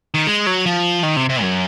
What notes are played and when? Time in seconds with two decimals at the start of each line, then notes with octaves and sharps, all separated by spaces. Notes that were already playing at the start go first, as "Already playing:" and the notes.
0.14 D#3
0.27 G#3
0.47 F#3
0.66 F3
1.03 D#3
1.16 C3
1.30 C3
1.42 F#2